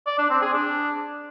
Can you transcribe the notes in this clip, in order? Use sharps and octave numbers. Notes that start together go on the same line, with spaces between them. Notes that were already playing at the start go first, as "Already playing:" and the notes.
D5
D4
C4
G#4
D4